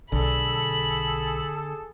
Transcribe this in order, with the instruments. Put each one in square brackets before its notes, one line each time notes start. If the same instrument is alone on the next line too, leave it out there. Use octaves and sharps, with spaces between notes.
[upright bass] B1 [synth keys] D3 [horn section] G#4 A4 [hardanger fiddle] B5